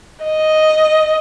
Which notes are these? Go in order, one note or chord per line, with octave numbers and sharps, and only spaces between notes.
D#5